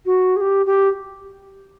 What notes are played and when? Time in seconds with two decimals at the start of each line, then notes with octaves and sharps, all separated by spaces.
0.05 F#4
0.36 G#4
0.41 G4
0.66 G4